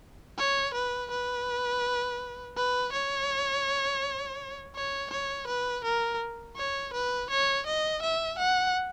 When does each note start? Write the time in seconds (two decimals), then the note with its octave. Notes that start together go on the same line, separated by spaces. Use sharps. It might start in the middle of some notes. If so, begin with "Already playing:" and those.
0.38 C#5
0.74 B4
1.11 B4
2.56 B4
2.92 C#5
4.75 C#5
5.10 C#5
5.47 B4
5.84 A#4
6.56 C#5
6.93 B4
7.30 C#5
7.66 D#5
8.02 E5
8.38 F#5